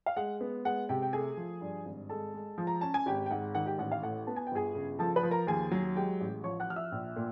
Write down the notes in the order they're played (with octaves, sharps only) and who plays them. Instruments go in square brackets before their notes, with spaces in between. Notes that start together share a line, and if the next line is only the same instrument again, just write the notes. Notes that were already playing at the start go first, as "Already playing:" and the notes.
[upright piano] F5
G#3 F#5
B3
G#3 F#5
C3 G4 G5
G5
A3 G#4 G#5
F3
G2
G#1
G#3 A4 A5
G#3
F3
A#5
C#4 A5
G#5
G#1 G4 G5
G5
G#2 F#5
D#3 F#5
G4 G5
A1 F#5
F5
A2 F#5
B3 A5
G#5
G5
G1 G#4 G#5
C#3
F3 A4 A5
B4 B5
F3
A#4 A#5
D#2 G#4 G#5
F#3
G#3 G4 G5
A1
F3 C#5 C#6
F#5 F#6
F3 F6
E5 E6
A#1
A#2